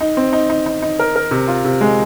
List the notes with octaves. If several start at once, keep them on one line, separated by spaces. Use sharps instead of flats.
D#4
C4
D#4
D#4
D#4
D#4
A#4
A#4
C3
F4
C3
G#3